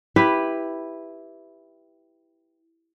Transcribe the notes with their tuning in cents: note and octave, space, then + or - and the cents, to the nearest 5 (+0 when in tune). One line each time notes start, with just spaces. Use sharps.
E4 +0 G4 +0 B4 +0